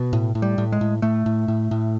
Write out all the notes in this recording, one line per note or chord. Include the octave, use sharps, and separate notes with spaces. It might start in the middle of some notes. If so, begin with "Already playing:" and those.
Already playing: B2
A2
A2
G3
A2
G#3
A2
A2 A3
A2
A2
A2